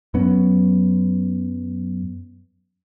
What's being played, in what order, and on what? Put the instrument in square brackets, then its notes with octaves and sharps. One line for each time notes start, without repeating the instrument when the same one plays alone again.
[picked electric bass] F#2 F#3 B3 C#4